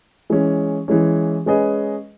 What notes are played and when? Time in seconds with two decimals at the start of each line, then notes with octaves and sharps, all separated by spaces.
0.30 E3 G#3 C#4
0.88 E3 G#3 C#4
1.46 G#3 C#4 G#4 B4 D#5